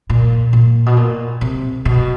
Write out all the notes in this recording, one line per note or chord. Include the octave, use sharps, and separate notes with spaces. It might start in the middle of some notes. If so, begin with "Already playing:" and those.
A#2
A#2
B2
A#2
C3
B2